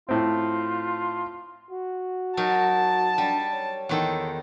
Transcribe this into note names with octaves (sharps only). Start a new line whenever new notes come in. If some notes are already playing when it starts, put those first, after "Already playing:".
A2 C4 F4
F#4
F#3 D#4 A#4 A5
G3 D4
C#5
E2 D#3 A4